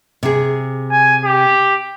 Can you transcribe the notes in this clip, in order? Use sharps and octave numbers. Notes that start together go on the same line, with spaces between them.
C3 G#4
G#5
G4